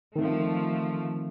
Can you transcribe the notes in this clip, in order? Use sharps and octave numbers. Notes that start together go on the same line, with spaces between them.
D#3 F3 A3 C4